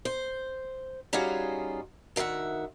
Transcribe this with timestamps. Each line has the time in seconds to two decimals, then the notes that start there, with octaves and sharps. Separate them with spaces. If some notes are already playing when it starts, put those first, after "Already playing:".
0.05 C5
1.13 G3 C#4 D#4 F4 F#4 G#4
2.16 D2 D#3 B4 E5 F#5